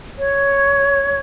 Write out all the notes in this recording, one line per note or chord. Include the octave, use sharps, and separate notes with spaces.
C#5